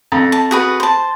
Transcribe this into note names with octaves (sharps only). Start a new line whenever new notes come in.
F2
A5
F#4 G#4 B4
C5 A5